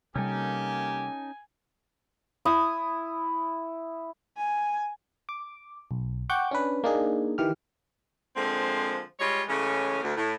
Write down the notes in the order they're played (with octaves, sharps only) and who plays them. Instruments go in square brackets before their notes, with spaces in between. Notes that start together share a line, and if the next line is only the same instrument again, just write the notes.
[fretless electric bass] C3 G3 [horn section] A#3 G4 [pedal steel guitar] C#4 D#4 A4 [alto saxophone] G#5
[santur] E4 D#6 E6
[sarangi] G#5
[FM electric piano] D6
B1
F#5 G5 C#6 D6 G6
C#4 D4 B4
A#3 D4 D#4 G#4
D#3 E3 G4 F6
[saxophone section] D3 F3 G#3 A#3 C4
G3 G#3 F4 C#5
A2 C#3 E3 G#3 C#4
D2
A2